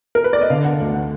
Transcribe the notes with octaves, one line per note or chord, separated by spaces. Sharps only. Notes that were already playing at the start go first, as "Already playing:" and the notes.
A#4
B4
D5
D#5
D3 F5
F#5
D2
F#5